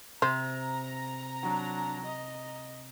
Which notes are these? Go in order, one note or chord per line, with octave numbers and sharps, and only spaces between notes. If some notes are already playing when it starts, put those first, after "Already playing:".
C3 C5 A#5
F#3 D4
D#5